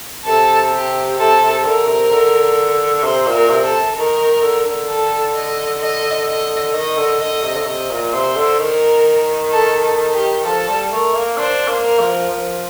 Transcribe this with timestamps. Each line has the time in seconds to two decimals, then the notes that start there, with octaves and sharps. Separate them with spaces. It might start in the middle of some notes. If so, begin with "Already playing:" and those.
0.25 C3 A4
0.72 G4
1.18 C3 A4
1.41 C3
1.64 D3 A#4
1.87 C3
2.10 D3
3.03 C3 C5
3.26 A#2
3.35 A#4
3.49 C3
3.65 A4
3.95 D#3 A#4
4.19 D#3
4.32 D#3
4.42 D3
4.66 D3
4.88 A4
5.35 D#5
5.81 D#5
6.27 D#5
6.73 D#3 D#5
6.97 D3
7.21 D3 D#5
7.44 C3
7.56 D3
7.66 C3 D#5
7.90 A#2
8.13 C3 C5
8.37 D3
8.59 D#3 A#4
9.52 A4
9.83 A4
10.14 G4
10.44 F3 A4
10.68 G3
10.92 A3 A#4
11.14 A#3
11.37 D4 C5
11.68 A#3
11.84 A#4
12.00 F3
12.30 F3